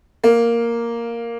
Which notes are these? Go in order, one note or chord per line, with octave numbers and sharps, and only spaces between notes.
A#3